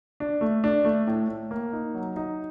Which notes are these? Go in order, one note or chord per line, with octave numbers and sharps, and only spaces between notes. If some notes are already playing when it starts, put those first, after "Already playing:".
D4
A3
D4
A3
A2
A2
A#3
D#4
F#3
D#4